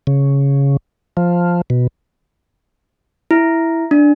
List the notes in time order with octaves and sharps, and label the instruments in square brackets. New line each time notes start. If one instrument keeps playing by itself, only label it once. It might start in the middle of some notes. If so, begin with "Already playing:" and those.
[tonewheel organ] C#3
F3
B2
[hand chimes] E4
D4